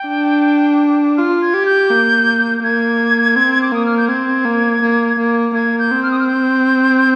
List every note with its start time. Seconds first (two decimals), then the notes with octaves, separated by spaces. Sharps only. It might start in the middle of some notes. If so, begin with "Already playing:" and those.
Already playing: G5
0.08 D4
1.17 F4 F6
1.42 G#6
1.54 G4
1.66 G6
1.91 A#3
2.63 A#3 G#6
3.36 C4
3.62 D6
3.72 A#3 D#6
3.86 F6
3.98 G6
4.08 C4 G#6
4.45 A#3
4.82 A#3
5.19 A#3
5.54 A#3 G#6
5.79 G6
5.91 C4
6.03 F6
6.11 D#6
6.19 F6
6.27 G6